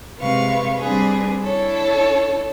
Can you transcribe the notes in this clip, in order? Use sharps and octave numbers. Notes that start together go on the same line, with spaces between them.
C3 G#3 B4 F5 C#6
G3 C4 D4 G#4 B4
D4 E4 A4 C#5